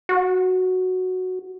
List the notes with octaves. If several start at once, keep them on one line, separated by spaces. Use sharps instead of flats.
F#4